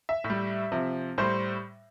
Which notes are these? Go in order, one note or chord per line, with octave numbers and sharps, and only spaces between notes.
E5
A2
G3
C3 F3
A2 G3 C5